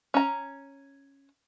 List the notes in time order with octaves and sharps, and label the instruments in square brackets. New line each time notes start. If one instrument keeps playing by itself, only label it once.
[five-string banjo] C#4 A#5